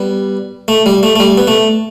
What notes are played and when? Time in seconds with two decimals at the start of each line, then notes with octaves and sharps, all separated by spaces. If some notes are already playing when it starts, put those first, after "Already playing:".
Already playing: G3 B3
0.68 A3
0.86 G3
1.03 A3
1.16 A3
1.20 G3
1.38 B3
1.47 A3